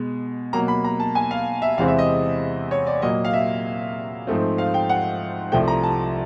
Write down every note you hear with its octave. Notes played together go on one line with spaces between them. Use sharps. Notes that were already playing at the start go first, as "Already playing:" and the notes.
Already playing: B2 G#3
B2 F#3 A#3 A#5
B5
A#5
A5
G#5
F5
E5
E2 C3 E3 G#3 C4 F5
E5
D#5
C#5
D5
A#2 F#3 A#3 D#5
F5
E5
G#2 F3 A3 C4
F5
G5
F#5
C2 C3 F3 A3 G5
A#5
A5